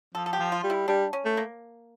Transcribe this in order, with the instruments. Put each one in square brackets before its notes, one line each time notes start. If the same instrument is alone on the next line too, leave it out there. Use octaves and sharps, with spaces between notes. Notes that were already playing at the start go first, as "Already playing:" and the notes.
[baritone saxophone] F3 [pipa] A4
[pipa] A4
G4
[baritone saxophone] F3
[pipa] F4
[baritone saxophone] G3
[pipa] E4
[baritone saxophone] G3 [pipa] D4
[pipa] C#4
[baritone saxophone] A3
[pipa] A#3